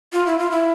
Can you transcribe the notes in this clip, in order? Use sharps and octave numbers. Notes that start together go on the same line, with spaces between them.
F4
E4
F4
E4